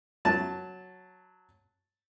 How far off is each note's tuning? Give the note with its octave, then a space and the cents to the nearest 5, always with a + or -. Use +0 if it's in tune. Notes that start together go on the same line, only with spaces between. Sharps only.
F#3 -5 A5 +0